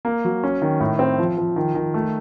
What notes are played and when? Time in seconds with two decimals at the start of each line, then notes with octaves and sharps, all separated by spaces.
0.05 A#3
0.25 F#3
0.44 C#4
0.62 D#3
0.80 A2
0.99 C4
1.18 F3
1.38 F3
1.56 D#3
1.75 D#3
1.94 A3